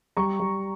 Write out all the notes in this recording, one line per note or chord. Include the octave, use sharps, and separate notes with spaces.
G3 A#5 C#6
G3